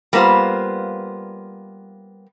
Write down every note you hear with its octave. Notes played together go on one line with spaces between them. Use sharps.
G3 A#3 B3 F4 C5